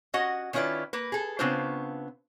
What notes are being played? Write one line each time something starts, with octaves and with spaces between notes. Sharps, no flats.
C#4 F#4 D#5 F#5
D#3 C#4 E4 F4 B4 D5
A#3 B4
G#4 A4
C#3 B3 C4 D4 F4 C5